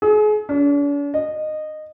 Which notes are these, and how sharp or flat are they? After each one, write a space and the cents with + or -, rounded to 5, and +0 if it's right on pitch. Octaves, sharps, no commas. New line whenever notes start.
G#4 +35
D4 -45
D#5 -15